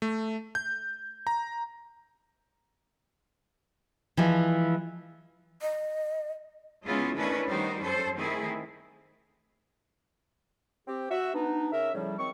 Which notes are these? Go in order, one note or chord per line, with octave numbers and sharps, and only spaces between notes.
A3
G6
A#5
E3 F3 G#3
D#5
C#3 G#3 B3 C#4 E4 F4
D#3 A3 C#4 D4 E4 B4
D#3 G3 D#4 F#4 C5
F#2 C#4 A4 C5
D#3 A3 C4 E4 G#4
C4 G4
F#4 E5
B3 D4 D#4
C#3 C#4 A#4 E5
A2 C#3 F3 G3
D#3 F#3 C4 C#6